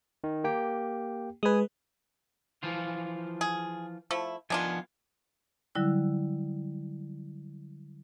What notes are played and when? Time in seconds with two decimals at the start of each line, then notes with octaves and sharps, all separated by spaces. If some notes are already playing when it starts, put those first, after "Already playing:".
0.24 D#3
0.44 A#3 G4 G5
1.43 G#3 B4 G#5 D#6
2.63 E3 F3 F4
3.41 G#4
4.11 F3 A3 E4
4.50 D#3 F3 B3 D4 F4 G#5
5.75 D3 F#3 G3 E4 E6 F#6